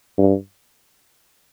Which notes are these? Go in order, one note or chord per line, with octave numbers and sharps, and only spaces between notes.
G2